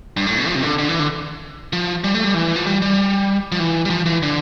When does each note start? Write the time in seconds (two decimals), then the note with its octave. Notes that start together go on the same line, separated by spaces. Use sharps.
0.17 G2
0.26 A2
0.37 B2
0.47 F3
0.55 C3
0.63 D3
0.78 D3
0.89 E3
0.99 D3
1.73 F3
2.04 G3
2.14 A3
2.24 G3
2.34 E3
2.56 F3
2.67 G3
2.82 G3
3.52 F3
3.60 E3
3.85 G3
3.90 F3
4.06 E3
4.23 D3